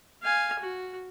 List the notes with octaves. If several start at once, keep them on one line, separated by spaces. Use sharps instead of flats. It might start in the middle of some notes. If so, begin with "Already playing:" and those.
F5 G#5
F#4